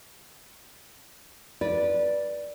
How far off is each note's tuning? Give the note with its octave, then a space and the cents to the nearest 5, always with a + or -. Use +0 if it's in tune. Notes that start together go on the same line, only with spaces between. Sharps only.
B4 -25 D5 +0